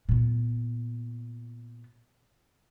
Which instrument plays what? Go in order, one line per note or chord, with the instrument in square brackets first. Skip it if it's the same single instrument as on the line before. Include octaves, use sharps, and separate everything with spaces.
[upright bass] A#2 B3